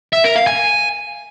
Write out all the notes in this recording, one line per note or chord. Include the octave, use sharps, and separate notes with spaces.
E5
A#4
F5
G#5